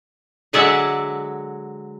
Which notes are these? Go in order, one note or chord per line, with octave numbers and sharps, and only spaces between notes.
D3 F#3 G#3 D5 E5 F#5